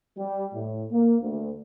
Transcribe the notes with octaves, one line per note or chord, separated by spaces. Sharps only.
G3
A2
A#3
D2